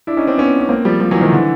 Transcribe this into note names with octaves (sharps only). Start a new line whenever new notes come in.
D4 E4
C#4 D#4
C4 D4
B3 C#4
C#4
A#3 C4
F3 G3
F3 G3
E3 F#3
D#3 F3
D3 E3